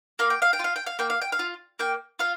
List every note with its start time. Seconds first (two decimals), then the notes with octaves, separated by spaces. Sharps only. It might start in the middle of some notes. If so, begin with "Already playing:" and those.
0.19 A#3 F5
0.30 G5
0.42 F5
0.53 G5
0.59 F4 F5
0.76 G5
0.86 F5
0.99 A#3 G5
1.10 F5
1.22 G5
1.32 F5
1.39 F4
1.79 A#3 G5
2.19 F4 F5